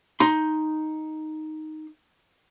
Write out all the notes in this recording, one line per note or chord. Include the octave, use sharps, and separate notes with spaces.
D#4 C6